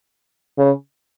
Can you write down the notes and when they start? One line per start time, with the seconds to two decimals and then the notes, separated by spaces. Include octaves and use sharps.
0.58 C#3